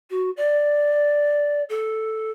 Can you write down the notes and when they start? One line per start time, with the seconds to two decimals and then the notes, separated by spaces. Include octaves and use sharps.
0.10 F#4
0.37 D5
1.69 A4